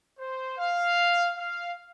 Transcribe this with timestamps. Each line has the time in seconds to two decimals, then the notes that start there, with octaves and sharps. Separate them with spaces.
0.19 C5
0.58 F5
1.36 F5